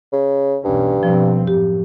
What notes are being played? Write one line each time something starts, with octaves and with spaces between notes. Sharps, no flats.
C#3
B1 E2 G2 C#4
B2 F3 G3 C4
F#2 A2 G4